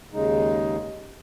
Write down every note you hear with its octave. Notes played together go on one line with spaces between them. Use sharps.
D#2 C#3 G#3 D#4